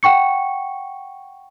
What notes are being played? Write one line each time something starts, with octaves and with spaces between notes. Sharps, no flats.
F#5 G5 C#6 C#7